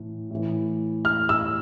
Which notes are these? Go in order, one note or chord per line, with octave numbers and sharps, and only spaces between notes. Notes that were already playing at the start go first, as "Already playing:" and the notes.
Already playing: A2 E3
A2 E3
F6
E6